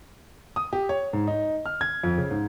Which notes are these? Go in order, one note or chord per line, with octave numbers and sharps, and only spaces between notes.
D#6
G4
C#5
G#2
D#4
F6
G#6
F2
C#3
G#2